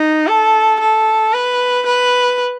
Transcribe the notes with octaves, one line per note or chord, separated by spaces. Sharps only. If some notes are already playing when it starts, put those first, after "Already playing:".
Already playing: D#4
A4
A4
B4
B4